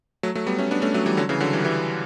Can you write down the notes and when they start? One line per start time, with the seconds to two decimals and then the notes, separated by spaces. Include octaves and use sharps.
0.23 F#3 A3
0.35 F#3 A3
0.47 G3 B3
0.58 A3 C#4
0.71 B3 D4
0.82 A3 C#4
0.94 F#3 A3
1.06 E3 G3
1.17 D3 F#3
1.29 C#3 E3
1.40 D3 F#3
1.53 E3 G3
1.65 E3 G3